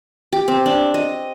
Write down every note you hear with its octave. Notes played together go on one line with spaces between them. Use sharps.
G4
C4
D4
D#5